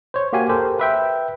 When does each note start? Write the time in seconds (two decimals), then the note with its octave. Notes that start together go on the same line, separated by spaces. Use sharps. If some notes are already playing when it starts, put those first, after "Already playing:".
0.14 C5 C#5
0.33 A#3 F#4 G4 F5 G#5
0.49 G4 A4 A#4 C5
0.79 B4 E5 G5